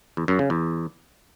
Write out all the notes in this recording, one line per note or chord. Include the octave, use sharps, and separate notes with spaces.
E2
F#2
C#3
E2